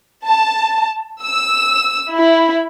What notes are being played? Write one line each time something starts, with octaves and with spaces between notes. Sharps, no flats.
A5
E6
E4